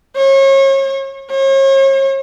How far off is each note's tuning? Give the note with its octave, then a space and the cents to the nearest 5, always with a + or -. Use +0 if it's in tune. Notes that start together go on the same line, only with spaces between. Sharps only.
C#5 -35
C#5 -40